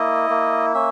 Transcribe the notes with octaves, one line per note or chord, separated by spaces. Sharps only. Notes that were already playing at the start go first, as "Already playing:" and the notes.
Already playing: A#3 E4 D#5
A#3
C#4 E5